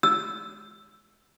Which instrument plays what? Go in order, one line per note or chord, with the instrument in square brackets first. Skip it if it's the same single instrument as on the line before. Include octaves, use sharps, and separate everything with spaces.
[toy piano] E6